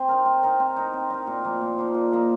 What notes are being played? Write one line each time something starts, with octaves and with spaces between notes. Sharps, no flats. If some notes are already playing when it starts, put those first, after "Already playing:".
Already playing: C4
D#4 A#4
C4
D#4 A#4
C4
D#4 A#4
C4
D#4 A#4
A#2
F3 A#3 D#4
A#2
F3 A#3 D#4
A#2
F3 A#3 D#4